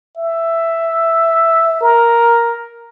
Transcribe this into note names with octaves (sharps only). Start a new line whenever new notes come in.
E5
A#4